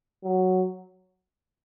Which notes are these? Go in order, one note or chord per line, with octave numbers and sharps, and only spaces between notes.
F#3